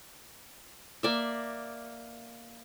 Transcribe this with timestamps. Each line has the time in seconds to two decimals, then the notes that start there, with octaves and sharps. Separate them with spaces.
1.03 A#3 D5 E5